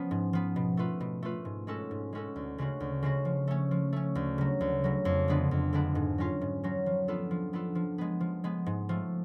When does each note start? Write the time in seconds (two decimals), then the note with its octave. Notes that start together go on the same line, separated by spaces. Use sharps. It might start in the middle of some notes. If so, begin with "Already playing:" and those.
Already playing: F3 B3 C#4
0.11 G#2
0.33 F3 B3
0.56 B2
0.77 A3 F4 B4
1.00 B2
1.23 A3 F4 B4
1.45 G#2
1.67 G#3 C#4 F#4 A4
1.91 G#2
2.13 G#3 C#4 F#4 A4
2.36 D2
2.58 C#3 G#3 C#4 F#4
2.80 D2
3.03 C#3 G#3 C#4 F#4
3.25 F3
3.48 A3 C#4
3.71 F3
3.93 A3 C#4
4.15 D2
4.38 C#3 F#3
4.61 D2
4.84 C#3 F#3
5.05 F2
5.28 D3 G#3 B3 D4
5.51 F2
5.73 D3 G#3 B3 D4
5.95 G#2
6.18 F#3 C#4 F4
6.41 G#2
6.63 F#3 C#4 F4
6.86 F3
7.08 B3 D4 F4 A4
7.31 F3
7.53 B3 D4 F4 A4
7.75 F3
7.98 G#3 B3
8.20 F3
8.44 G#3 B3
8.66 G#2
8.89 F3 A3